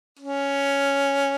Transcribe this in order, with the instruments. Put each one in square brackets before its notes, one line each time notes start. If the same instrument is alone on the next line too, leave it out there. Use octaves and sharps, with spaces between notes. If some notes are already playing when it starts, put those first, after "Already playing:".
[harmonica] C#4